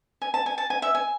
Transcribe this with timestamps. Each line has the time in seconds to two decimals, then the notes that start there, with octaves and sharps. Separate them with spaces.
0.22 G#5
0.34 A5
0.46 G#5
0.58 A5
0.70 G#5
0.82 E5
0.95 G#5